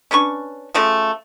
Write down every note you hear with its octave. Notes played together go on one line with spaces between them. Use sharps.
C#4 D4 B4 C#6
C#3 F3 A3